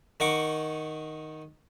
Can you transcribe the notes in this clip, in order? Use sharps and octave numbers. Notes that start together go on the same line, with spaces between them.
D#3 D#4 F#5 C#6 D6